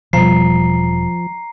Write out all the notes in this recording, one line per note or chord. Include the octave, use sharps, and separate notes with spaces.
E1 B2 F3 G3 A#5 C7